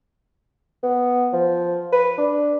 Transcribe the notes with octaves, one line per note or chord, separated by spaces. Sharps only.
B3
F3
B4
D4